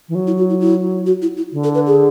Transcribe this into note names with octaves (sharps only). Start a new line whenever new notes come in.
E3
F#3
E4
F#4
E4
E4
F#4
E4
E4
D3
A4
B4
G#4